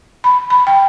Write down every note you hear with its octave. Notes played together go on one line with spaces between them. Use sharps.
B5
B5
G5